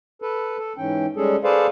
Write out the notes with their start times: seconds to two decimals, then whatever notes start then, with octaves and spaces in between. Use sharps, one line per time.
0.22 A4 B4
0.58 A4
0.78 G#2 E3 C#4 G5
1.16 G3 G#3 C#4 G#4 A4
1.44 G#4 A4 B4 C5 D5 F5